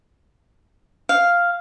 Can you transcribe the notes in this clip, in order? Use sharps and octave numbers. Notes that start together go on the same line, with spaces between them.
F5